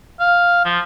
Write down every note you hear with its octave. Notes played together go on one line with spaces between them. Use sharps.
F5
F3